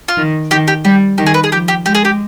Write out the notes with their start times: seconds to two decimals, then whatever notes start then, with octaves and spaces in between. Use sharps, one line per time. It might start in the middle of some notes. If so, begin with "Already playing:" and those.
0.08 F4
0.17 D#3
0.51 D#3 G4
0.68 G4
0.85 G3 G4
1.18 D#3 G4
1.26 G#4
1.34 B4
1.44 G#4
1.52 F3 G4
1.68 G4
1.85 G#3 G4
1.95 G#4
2.05 G4